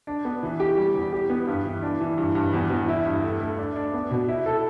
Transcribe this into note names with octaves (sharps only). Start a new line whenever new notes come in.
D4
B3
E3
G4
G3
E2
G4
B3
G2
E3
D4
E3
G2
G2
E2
E2
E4
G2
A3
A3
D4
D4
B3
B2
E4
A4